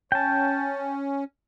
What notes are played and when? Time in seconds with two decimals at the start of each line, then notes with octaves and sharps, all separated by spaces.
0.12 C#4 G5 A5